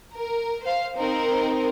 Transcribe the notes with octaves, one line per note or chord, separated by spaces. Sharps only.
A#4
C5 F5
C4 D#4 A#4